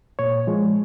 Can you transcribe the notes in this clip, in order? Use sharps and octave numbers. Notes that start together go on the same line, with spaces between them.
A#2 C#5
F3 G#3